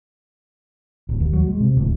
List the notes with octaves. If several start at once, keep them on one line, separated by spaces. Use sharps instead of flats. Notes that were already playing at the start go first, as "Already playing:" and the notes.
D1
D#2
F#3
G#3
C3
D1